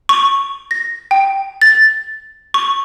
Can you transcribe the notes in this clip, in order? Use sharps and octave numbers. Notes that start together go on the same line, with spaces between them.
C#6
A#6
G5
A6
C#6